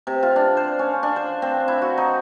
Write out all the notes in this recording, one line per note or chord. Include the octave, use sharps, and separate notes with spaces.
C3
F4
D4
C5
C#4
D4
C5
C4
E4
F#4
D#4